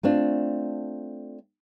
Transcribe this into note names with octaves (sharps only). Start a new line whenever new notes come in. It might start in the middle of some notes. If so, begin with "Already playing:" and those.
A3 C4 D4 F4